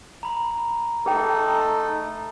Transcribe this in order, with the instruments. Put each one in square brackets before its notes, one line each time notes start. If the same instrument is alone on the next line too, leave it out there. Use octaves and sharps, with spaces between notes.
[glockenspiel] A#5 B5
[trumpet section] A3 A4 [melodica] D#4 [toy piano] G#4 G5